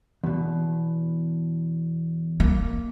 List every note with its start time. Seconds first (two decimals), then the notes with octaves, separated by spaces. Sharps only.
0.24 E2 B2
2.40 A#3